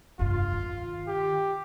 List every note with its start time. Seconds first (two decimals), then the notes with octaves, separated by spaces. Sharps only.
0.19 F1 G2 F4
0.53 D#3
1.07 G4